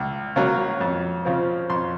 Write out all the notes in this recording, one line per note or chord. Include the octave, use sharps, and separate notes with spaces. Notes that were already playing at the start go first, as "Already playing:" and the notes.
Already playing: C#2
C#3 F#3 A#3 C#4
F2
C#3 F3 C4
F2 C6